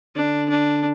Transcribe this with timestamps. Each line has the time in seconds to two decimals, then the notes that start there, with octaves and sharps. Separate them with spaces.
0.16 D3 D4
0.49 D4